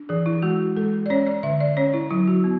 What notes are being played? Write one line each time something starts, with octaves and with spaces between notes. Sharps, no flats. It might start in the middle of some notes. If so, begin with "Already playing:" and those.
Already playing: D4
E3 G#4
E4
G#3 F#4
G#3 A4
D5
C#4 C#5
D5
D3 E5
D5
C#4 C#5
E4
F#3 E4
F#4
B3